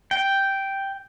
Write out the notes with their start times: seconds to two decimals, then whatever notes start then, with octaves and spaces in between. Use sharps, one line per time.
0.11 G5